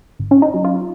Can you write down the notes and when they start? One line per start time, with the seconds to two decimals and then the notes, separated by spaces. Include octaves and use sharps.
0.19 G#1
0.31 C#4
0.42 D#4
0.54 F#3
0.64 F4